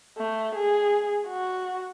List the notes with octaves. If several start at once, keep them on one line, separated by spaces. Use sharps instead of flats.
A3
G#4
F#4